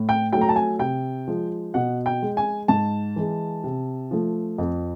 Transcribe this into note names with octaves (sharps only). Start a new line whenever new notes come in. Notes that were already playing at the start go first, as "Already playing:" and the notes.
Already playing: A2
G5
F#3 A3 G5
A#5
A5
G#5
C3 G5
F3 G#3
B2 F#5
G5
G#3
G#5
G#2 A5
E3 G#3
C3
F3 A3
F2